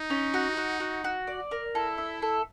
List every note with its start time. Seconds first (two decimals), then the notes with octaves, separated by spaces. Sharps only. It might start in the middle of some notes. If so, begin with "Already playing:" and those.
Already playing: D#4
0.10 C#4
0.34 F#4
0.57 F#4
0.80 F#4
1.04 F#4
1.27 D5
1.51 A#4
1.75 E4 A4
1.98 E5
2.22 A4